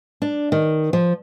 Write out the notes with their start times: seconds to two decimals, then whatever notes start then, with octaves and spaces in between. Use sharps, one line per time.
0.22 D4
0.52 D#3
0.93 F3